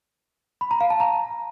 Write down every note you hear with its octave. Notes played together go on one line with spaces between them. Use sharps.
B5
A#5
F5
A5
A#5